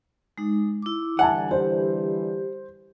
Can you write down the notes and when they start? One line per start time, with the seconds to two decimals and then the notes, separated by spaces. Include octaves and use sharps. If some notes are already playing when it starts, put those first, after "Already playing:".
0.38 G#3 D#4
0.82 E4 D6
1.19 D3 E3 G3 E5 F#5 G#5 A5
1.51 G4 C5